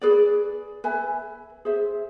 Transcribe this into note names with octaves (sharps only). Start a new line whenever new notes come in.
G#4 B4 D5
B4 E5 G#5
G#4 C5 E5